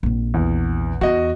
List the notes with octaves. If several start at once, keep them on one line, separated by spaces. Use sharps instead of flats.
A#1 C3
E2
E2 F#4 D#5